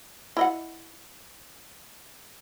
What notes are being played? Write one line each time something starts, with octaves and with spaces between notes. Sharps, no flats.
E4 D#5 F#5